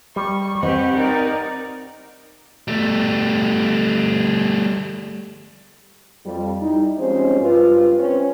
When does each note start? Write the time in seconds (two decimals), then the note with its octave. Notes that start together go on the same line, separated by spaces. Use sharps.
0.16 G3 C#6
0.63 C4 G4 B4 D#5 F#5
0.96 D#4 A#4 D5
2.68 G3 A3
6.26 F2 G3
6.61 G3 D#4 E4
6.99 F3 G#3 C4 C#4 G4 C5
7.41 G2 F4 B4
7.98 C4 C#4